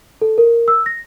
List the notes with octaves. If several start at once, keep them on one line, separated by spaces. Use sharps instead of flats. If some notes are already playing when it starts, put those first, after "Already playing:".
A4
A#4
E6
A#6